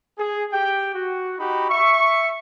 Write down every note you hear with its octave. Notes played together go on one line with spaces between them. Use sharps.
G#4
G4 G5
F#4
D#4 F#4 G4 B5
E5 C#6